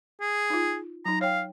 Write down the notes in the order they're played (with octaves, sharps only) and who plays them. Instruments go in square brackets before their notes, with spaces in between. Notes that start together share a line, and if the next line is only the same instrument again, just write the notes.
[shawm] G#4
[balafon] D#4 F4
[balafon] F#3 D#4 [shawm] A#5
[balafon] C#5 G5 [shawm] F5